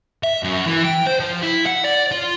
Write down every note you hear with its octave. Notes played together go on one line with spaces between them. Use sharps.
E5
F#2
E3
G5
C5
F3
E4
F#5
D5
F4